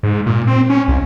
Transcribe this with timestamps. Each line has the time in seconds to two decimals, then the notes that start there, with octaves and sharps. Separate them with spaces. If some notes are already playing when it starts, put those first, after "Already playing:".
0.03 G#2
0.26 A#2
0.47 C4
0.70 C#4
0.88 C2